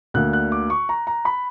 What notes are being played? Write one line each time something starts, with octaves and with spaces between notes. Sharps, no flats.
D2 D3 A#3 F#6
F#6
D6
C#6
A#5
A#5
B5